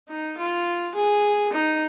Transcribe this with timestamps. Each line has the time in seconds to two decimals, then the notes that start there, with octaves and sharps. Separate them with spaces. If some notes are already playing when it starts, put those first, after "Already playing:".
0.09 D#4
0.38 F4
0.95 G#4
1.53 D#4